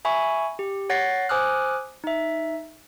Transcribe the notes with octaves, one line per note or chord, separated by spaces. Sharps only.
E5 G#5 B5 C#6
G4
C#5 F#5 A6 A#6 C7
C5 G#5 D6 D#6 F6 F#6
D#4 E5